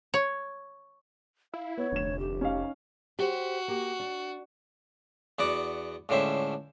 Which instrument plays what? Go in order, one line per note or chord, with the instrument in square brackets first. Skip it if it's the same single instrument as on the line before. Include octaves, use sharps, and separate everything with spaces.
[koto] C#5
[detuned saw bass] E4 [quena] F5
[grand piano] B3 [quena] C#5
[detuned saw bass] F1 [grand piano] D2 E7
[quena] G4
[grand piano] C#4 D#4 F5
[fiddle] F#4 [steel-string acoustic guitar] G4 C5
[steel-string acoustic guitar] A#3 G4
D4
[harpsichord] E2 B3 F#4 D5
C#2 A2 D3 C#4 C5 E5